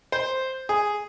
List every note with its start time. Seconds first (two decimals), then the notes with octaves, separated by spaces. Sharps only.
0.12 C5
0.69 G#4